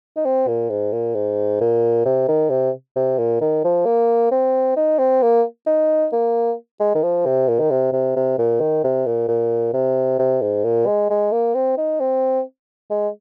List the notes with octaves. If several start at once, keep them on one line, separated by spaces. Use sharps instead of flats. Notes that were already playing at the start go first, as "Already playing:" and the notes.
D#4
C4
A#2
G#2
A#2
G#2
A#2
C3
D#3
C3
C3
A#2
D#3
F3
A#3
C4
D#4
C4
A#3
D#4
A#3
G#3
D#3
F3
C3
A#2
D#3
C3
C3
C3
A#2
D#3
C3
A#2
A#2
C3
C3
G#2
A#2
G#3
G#3
A#3
C4
D#4
C4
G#3